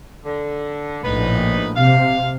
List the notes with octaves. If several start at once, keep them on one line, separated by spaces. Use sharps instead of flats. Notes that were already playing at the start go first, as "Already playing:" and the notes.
D3
A#1 A2 B3 D#4 B4
C3 F5